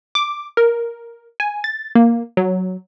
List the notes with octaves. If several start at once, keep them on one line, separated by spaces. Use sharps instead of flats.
D6
A#4
G#5
A6
A#3
F#3